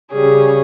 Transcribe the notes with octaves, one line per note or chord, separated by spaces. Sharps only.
C#3 G3 C#4 G#4